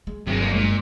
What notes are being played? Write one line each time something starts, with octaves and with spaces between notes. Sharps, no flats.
G#3
G1 C3 F#3 G#3
G2 A#3
G2 A#2 G#3